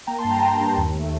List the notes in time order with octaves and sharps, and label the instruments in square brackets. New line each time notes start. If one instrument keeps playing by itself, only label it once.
[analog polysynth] A#3 G5 A#5
A5 C6
G2
G5 A#5
A#3
G2
D#2
A3